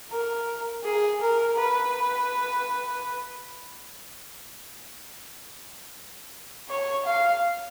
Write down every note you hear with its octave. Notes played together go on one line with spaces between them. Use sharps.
A#4
G#4
A#4
B4
C#5
F5